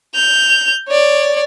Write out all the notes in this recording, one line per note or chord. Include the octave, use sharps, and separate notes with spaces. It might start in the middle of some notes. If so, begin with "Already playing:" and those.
G6 F7
C#5 D5